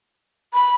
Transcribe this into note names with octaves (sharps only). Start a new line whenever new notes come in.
B5